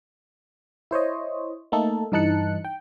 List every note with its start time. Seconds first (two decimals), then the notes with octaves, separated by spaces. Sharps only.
0.91 E4 C5 C#5 D#5
1.72 A3 A#3 D#4 A4
2.12 G2 E3 D#4 A5 F#6 C#7
2.65 G5